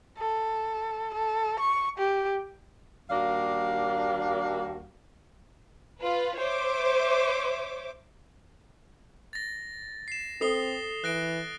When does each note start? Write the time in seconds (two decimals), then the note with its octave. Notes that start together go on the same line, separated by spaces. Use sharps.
0.18 A4
1.14 A4
1.60 C#6
1.98 G4
3.10 D#2 G3 A#3 D4 F#4 F5
6.00 F4 B4
6.38 C5 C#5 E5 D6
9.33 A6 A#6
10.08 C7 E7
10.41 C4 A4 D#6 C7 G7
11.04 E3 F#6 A#6 D7